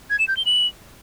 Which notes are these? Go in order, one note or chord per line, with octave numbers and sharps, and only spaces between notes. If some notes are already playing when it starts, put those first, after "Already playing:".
G#6
E7
G6
G7
F#7